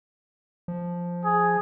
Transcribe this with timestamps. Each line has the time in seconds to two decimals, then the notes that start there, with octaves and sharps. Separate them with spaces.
0.68 F3
1.25 G#4